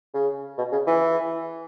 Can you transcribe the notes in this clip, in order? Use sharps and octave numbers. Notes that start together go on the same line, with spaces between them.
C#3
B2
C#3
E3